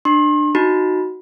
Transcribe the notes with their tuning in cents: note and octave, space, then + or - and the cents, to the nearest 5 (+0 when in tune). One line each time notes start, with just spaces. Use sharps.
D4 +25 C6 +40
D#4 +0 F#4 +0 B5 -30